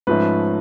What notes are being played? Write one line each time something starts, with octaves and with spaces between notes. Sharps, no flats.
G#2 F3 A3 C#4 B4